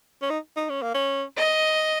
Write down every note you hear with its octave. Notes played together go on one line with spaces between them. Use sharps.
C#4
D#4
D#4
C#4
A#3
C#4
D#5